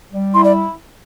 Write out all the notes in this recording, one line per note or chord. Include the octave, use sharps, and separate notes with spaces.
G3
E4 C6
D5